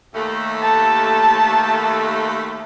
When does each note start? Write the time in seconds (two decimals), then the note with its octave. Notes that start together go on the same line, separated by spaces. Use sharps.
0.15 D#2 A3
0.62 A5